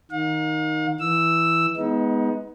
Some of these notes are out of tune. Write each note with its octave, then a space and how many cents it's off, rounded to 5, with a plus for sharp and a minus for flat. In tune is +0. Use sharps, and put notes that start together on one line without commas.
D#3 +0 F5 +45
E3 +0 E6 +0
G#3 +0 B3 +0 D#4 +30